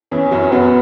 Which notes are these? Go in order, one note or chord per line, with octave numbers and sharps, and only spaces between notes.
E2 E3 C#4
F#2 F#3
F#2 F#3 B3